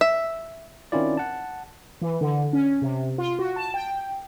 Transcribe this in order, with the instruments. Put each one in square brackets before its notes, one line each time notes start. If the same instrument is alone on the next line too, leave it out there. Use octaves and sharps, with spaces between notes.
[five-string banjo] E5
[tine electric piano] D#3 C4 C#4 E4 F4 D5
F#5 A5
[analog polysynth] E3
D3
C#4
C3
F4
F#4
A5
G5